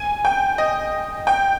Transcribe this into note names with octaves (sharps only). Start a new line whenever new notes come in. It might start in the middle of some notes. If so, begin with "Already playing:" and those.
Already playing: G#5
G5
D#5
G5